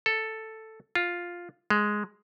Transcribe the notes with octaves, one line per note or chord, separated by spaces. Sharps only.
A4
F4
G#3